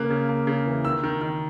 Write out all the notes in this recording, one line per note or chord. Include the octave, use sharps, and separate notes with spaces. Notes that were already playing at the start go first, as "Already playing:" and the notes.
Already playing: C#3 A#3 F#6
C#3
A#3
C#3
E3
D#3 E6
D#3
D#3